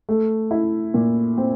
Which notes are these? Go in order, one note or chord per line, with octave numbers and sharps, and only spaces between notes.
A3
E4
A#2
C4